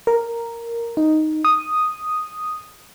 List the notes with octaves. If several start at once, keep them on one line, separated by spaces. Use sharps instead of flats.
A#4
D#4
D#6